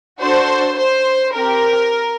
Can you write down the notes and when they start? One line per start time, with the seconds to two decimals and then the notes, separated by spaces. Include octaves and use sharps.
0.21 D4 F#4 A4 C5
0.78 C5
1.34 C4 G4 A#4